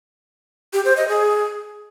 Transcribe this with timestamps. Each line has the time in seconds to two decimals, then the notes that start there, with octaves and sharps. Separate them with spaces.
0.73 G4
0.85 C5
0.97 D#5
1.08 G#4